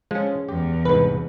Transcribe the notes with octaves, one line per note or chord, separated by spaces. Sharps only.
F3 G#3 C#4
E2 G4
C2 G#2 B4